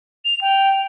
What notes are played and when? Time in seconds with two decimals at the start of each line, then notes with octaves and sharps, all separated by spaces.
0.25 F7
0.41 G5